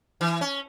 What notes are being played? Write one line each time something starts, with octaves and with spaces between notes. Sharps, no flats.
E3
C#4